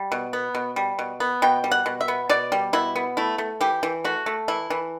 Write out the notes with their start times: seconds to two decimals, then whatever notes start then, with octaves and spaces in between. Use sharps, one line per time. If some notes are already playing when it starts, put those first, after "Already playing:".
Already playing: G3
0.12 B2
0.33 B3
0.55 B2
0.76 G3
0.99 B2
1.20 B3
1.42 B2 G5
1.64 G3
1.71 F#5
1.86 B2
2.01 E5
2.08 B3
2.29 B2 D5
2.52 G3
2.73 B2 E4
2.96 B3
3.17 A3 E4
3.38 A3
3.61 E3 G4
3.83 E3
4.04 A3 F#4
4.26 A3
4.48 E3 E4
4.70 E3